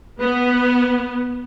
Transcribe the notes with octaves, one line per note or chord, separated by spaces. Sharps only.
B3